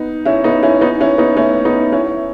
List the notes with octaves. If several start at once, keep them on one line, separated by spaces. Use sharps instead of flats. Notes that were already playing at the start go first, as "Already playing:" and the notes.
Already playing: B3 D#4
C#4 E4
B3 D#4
C#4 E4
B3 D#4
C#4 E4
B3 D#4
A3 C#4
B3 D#4
C#4 E4